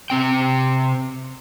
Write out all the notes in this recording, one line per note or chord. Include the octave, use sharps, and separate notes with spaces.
C3 C4 G5